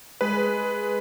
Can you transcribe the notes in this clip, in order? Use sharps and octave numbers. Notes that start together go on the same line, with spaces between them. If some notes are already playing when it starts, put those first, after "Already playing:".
G#3 B4